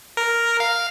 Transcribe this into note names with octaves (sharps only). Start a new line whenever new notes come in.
A#4
F5